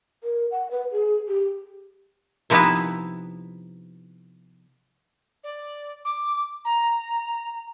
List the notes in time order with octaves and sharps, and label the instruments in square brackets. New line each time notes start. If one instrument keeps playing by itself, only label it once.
[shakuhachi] A#4
F#5
B4
G#4
G4
[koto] C3 F3 B3 D#4 E4 B4
[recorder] D5
D6
A#5